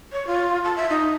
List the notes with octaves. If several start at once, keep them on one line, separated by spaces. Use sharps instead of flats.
C#5
F4
A5
E5
D#4